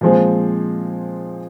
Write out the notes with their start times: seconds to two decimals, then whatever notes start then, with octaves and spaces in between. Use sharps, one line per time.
0.01 A#2 F3 G#3 C4